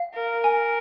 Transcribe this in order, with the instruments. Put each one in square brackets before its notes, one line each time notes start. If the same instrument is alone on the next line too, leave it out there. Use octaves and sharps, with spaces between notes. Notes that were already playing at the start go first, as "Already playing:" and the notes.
Already playing: [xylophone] F5
[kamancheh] A#4
[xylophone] G#5